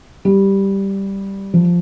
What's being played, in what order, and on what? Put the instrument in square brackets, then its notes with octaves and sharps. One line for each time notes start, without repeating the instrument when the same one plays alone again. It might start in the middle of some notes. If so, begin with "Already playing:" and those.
[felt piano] G3
F3